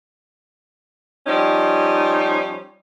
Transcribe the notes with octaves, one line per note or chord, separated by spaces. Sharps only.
F3 G3 C#4 D#4